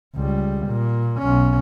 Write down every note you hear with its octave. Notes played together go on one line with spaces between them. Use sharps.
C#2 G3
A#2
B1 C#4